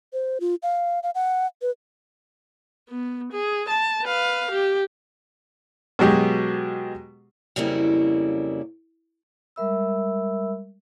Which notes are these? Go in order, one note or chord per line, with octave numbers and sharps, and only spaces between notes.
C5
F4
F5
F5
F#5
B4
B3
G#4
A5
B4 F5
G4
B2 F#3 G#3 G4
F2 C#3 F#3 G3 A#3 E4
G3 G#3 A#4 E5 B5 E6